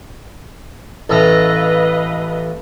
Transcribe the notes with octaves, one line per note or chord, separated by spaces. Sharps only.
A1 A4 B4 D#5 F5 A#5